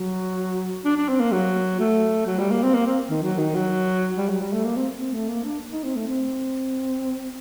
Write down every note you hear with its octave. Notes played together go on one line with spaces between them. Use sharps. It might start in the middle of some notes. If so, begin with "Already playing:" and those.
Already playing: F#3
D4
D4
C4
A#3
F#3
A3
F#3
G3
A#3
C4
A#3
C4
D#3
F#3
D#3
F#3
G3
F#3
G3
A3
A#3
C4
C4
A3
A#3
D4
D#4
C4
A3
C4